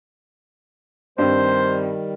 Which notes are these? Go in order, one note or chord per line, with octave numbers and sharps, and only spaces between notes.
G2 D#3 G3 C4 C5